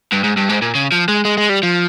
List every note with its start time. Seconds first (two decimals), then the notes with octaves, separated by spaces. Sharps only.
0.13 G2
0.24 G#2
0.37 G2
0.49 G#2
0.62 A#2
0.75 C#3
0.92 F3
1.08 G#3
1.25 G#3
1.38 G#3
1.49 G3
1.63 F3